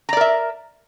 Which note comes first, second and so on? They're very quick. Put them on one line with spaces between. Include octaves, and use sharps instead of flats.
A#5 D5 A#4 E5